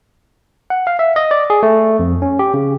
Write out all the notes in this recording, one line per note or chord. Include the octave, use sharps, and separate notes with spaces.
F#5
F5
E5
D#5
D5
G#4
A3
F2
C#4
G4
C#3